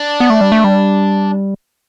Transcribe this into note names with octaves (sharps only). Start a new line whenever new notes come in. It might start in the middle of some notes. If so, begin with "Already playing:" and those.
Already playing: D4
B3
A3
G3
A3
G3